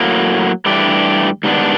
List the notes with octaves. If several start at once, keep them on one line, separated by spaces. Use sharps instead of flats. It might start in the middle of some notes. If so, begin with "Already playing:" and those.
Already playing: A2 F#3 A#3
G2 E3 A3 D4 G4
G#2 D#3 G3 B3 D4